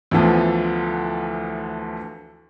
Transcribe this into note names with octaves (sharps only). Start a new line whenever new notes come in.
D2 D3 E3 F3 B3